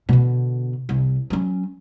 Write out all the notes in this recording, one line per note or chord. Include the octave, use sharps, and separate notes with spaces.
B2 D3
C2
F#3 C#4